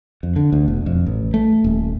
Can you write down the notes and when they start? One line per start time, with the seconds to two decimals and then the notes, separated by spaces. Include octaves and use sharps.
0.23 F2
0.36 D3
0.52 D2
0.68 E1
0.86 F2
1.07 A1
1.34 A3
1.64 D#1